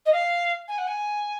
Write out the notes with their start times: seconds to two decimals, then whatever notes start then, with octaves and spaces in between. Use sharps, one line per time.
0.06 D#5
0.12 F5
0.68 G#5
0.78 F#5
0.87 G#5